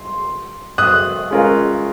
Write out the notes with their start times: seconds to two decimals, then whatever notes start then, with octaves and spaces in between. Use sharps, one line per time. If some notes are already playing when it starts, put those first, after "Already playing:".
Already playing: C6
0.78 D#6 F#6
1.31 G#3 C#4 F4 A#4